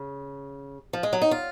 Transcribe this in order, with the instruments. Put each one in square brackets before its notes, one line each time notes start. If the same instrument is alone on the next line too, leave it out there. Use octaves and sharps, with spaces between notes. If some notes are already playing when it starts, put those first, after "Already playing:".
Already playing: [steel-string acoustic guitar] C#3
F3
G#3
F#3
D#4
F4